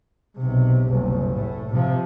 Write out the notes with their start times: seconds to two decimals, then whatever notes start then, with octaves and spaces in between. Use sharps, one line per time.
0.38 B1 C3
0.88 F#1 C2
1.34 A2
1.72 C3 F3